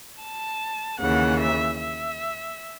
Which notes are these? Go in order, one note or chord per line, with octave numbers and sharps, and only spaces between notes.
A5
D#2 C#3 E3 F#5
E5
E5